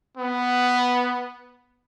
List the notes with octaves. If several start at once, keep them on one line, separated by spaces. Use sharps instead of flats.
B3